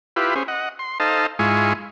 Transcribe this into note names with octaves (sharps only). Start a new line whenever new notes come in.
E4 F4 G4 B4
C#4 G#4 C5
D#5 F#5
C6
D#4 A4 C5 D#5 F5 A5
G#2 G#3 E4 F4 G#5 C#6